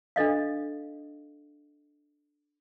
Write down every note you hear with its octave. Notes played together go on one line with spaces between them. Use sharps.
D4 A4 D#5 F5